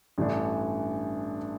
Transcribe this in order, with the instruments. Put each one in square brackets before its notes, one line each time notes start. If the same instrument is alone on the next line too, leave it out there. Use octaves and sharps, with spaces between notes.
[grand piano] A1 G2 E3 A3 D4